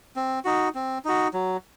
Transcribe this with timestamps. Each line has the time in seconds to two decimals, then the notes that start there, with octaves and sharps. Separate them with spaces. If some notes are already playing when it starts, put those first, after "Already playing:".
0.16 C4
0.45 D#4 F#4
0.75 C4
1.05 D#4 F#4
1.33 F#3